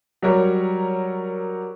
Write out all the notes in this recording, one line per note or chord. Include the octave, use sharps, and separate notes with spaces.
F#3 G3 A#4 C#5